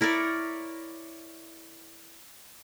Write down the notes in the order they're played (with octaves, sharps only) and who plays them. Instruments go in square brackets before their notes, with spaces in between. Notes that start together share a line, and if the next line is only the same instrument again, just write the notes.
[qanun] E4 A#4 C#5 D5